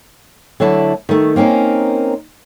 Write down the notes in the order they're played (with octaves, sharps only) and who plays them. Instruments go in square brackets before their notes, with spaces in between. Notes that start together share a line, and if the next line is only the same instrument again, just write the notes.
[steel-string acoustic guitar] D3 F#3 A3 E4 A5
D#3 A3
A#3 C4 C#4 D#4 A#4